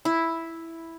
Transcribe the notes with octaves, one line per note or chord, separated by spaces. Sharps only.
E4